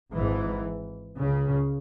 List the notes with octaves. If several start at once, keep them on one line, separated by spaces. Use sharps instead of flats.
G#1 G#2 E3
C#2 C#3